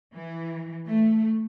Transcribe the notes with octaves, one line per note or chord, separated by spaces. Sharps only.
E3
A3